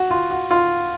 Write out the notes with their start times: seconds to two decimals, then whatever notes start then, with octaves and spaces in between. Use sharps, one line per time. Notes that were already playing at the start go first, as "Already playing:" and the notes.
Already playing: F#4
0.11 F4
0.31 F#4
0.51 F4